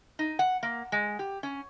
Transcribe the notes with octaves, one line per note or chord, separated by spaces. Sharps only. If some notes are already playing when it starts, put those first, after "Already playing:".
D#4
F#5
A#3
G#3
G4
C#4